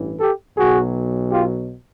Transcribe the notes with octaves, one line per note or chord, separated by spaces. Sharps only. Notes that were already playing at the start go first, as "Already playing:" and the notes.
Already playing: A1 G2 E3
G4 A4
B1 B2 F#3 F#4 G#4
F4 G4